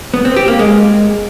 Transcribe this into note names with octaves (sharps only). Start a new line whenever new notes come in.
B3
C4
G4
A#3
G#3